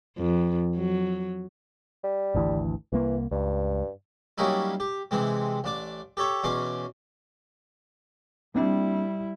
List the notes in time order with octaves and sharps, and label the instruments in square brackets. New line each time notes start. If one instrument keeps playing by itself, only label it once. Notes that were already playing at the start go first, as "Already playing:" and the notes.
[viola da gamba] F2
F#3
[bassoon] G3
[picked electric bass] G#1 D2 E3
[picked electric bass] C2 A#3 [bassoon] E3
[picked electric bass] C#2 [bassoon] G2
[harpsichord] F#3 G3 A#3 C#4 D#4 E4
G4
C3 E3 G#3 C4
A1 D4 D6
G4 A4 C#5 E5
E2 B2 C#4 C6 D6
[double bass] G3 E4 [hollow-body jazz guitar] A#3 C4 D4